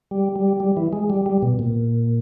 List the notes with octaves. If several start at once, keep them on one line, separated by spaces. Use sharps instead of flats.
G3
G3
G3
E3
G#3
G3
G3
B2
A#2